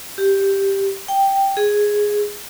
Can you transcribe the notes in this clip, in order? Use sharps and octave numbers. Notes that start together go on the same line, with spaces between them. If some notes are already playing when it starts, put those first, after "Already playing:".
G4
G5
G#4